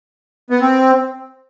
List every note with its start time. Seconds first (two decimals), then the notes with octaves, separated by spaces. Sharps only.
0.50 B3
0.61 C4